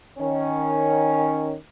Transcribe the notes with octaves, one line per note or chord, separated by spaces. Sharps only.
D#3 C#4